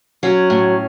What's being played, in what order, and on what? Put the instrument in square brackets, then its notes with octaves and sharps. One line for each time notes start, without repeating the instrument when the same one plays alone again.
[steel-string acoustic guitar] F#3 C#4
A2